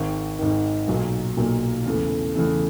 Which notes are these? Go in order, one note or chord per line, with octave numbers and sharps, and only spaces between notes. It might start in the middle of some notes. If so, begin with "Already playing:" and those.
Already playing: G#1 G#2 D#3
G#1 G#2 D#3
B1 A#2 F#3 A#3
B1 A#2 F#3 A#3
E2 C#3 E3 A3
E2 C#3 E3 A3